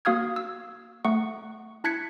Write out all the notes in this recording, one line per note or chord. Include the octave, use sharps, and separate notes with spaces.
A#3 F#4 F5 D#6 F6 G#6
E6
A3 F#5 C#6
E4 A5 F#6 G#6 B6 C#7